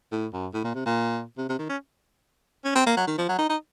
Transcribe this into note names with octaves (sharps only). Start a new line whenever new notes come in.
A2
F#2
A2
A#2
C3
A#2
C3
C3
D#3
C#4
C#4
C4
A#3
F#3
D#3
F3
F#3
D#4
D#4